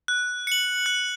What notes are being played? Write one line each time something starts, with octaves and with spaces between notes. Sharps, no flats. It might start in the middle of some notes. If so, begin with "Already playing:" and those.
F#6
C#7 F#7
F#6